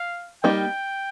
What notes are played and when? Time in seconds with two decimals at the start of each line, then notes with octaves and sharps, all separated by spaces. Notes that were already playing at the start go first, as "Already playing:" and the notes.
Already playing: F5
0.44 G3 A#3 D#4 G4 G5